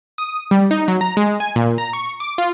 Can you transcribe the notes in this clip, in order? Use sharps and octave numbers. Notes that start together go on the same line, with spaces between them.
D#6
G3
D#4
F#3
A#5
G#3
G#5
A#2
A#5
C#6
D6
F4